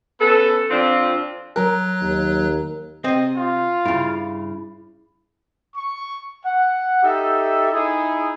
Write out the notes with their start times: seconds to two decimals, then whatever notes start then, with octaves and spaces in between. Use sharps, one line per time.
0.21 B3 C#4 A4
0.70 F2 F3 C4 D4 F4
1.56 F#3 A#4 F#6
2.01 D#2
3.04 C3 C4 D#5
3.37 F4
3.85 G2 C#3 E4
5.76 C#6
6.44 F#5
7.02 D#4 G4 A4 E5
7.73 D#4 E4 G#4